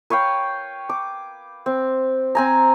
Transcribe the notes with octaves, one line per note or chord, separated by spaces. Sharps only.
B4 C#5 F5 G5
D6
C4
C4 G#5 A#5